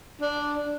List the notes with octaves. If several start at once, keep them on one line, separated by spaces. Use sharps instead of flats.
D4